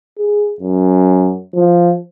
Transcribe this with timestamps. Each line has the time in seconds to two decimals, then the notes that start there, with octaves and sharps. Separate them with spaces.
0.18 G#4
0.61 F#2
1.54 F3